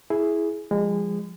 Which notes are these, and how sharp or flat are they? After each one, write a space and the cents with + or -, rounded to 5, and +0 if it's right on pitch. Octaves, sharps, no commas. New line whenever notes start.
E4 +0 G#4 +10
F3 +0 G#3 -30